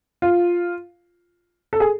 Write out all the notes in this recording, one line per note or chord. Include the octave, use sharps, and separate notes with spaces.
F4
A4
G#4